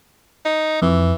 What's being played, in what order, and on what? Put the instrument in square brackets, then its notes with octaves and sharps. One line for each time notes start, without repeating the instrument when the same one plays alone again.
[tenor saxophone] D#4
[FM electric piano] F2 [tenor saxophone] E3